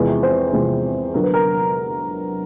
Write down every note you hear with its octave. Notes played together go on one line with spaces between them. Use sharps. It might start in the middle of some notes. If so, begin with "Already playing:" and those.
Already playing: E2 C3 F3 G#3 C4
C5
E2 C3 F3 G#3 C4
D3 F#3 B3 A#4
B4
A#4